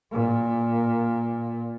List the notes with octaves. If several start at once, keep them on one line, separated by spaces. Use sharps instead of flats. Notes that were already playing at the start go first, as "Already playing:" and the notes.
A#2